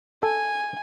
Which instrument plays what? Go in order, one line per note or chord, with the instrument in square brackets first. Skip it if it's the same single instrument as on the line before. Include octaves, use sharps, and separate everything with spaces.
[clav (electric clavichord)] A4 [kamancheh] G#5